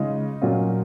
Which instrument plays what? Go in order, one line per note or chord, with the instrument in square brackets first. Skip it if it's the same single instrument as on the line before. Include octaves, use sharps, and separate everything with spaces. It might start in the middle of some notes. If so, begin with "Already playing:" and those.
Already playing: [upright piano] C#3 G#3 C#4 D#4 F4 D#5
A#2 F#3 C#4 F4